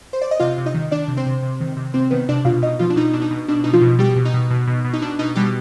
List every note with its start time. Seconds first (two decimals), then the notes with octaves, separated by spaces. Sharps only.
0.13 C5
0.22 D5
0.31 D#5
0.40 C3 F4 F5
0.58 C3
0.66 D#4 D#5
0.74 D#3
0.91 D#3 D4 D5
1.08 C3
1.17 C4 C5
1.26 C3
1.43 C3
1.61 D#3
1.77 C3
1.94 C3 C4 C5
2.11 D#3 B3 B4
2.29 C3 D4 D5
2.45 B2 F4 F5
2.62 B2 D#4 D#5
2.79 B2 F3 F4
2.90 D4
2.96 B2 D#4
3.13 B2 D4
3.22 D#4
3.31 B2
3.48 B2 D4
3.64 B2 D#4
3.73 F3 F4
3.82 B2
3.99 B2 G3 G4
4.16 B2
4.25 D#4
4.34 B2
4.51 B2
4.67 B2
4.85 B2
4.93 D#4
5.02 B2 D4
5.19 B2 D#4
5.36 B2 G3 G4